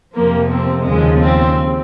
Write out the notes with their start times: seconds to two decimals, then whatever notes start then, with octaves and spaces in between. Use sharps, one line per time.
0.15 F2 C3 F3 A#3
0.50 C4
0.85 D#2 C#3 F3 G#3
1.21 C4